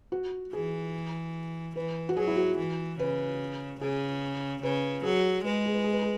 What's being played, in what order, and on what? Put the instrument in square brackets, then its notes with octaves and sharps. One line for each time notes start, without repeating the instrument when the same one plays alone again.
[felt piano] F#4
[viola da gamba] E3 [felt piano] G#4
[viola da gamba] E3 [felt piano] B4
[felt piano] F#4
[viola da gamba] F#3 [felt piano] G#4
[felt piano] E4
F#4
[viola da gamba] E3
[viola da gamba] C#3 [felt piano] B4
[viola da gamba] C#3 [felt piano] G#4
[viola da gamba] C#3 [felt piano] B4
[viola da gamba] F#3 [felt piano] G#4
[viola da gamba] G#3 [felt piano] B4
[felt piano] G#4
B4
G#4
B4
G#4